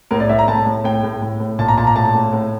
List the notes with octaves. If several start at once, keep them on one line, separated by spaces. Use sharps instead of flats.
A2 A#4
D5
A2 E5
A#5
A2 A5
A2
A2 G5
A2
A2
A2
A#2 A5
A#5
A#2 A5
A#5
A2 A5
A2
A2